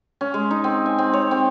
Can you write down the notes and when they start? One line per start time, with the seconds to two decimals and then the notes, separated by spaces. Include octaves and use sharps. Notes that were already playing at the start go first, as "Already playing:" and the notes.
0.21 C#4
0.34 G#3
0.51 D#4
0.64 C4
0.86 G#5
0.98 C4
1.14 C#5
1.31 C4